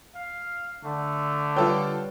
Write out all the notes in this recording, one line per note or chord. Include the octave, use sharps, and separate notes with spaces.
F5
D3 A3
G3 F4 A4 B4 C#5 G5